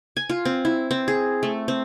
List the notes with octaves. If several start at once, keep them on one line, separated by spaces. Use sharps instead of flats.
G#5
F4
C4
E4
C4
G#4
A3
C4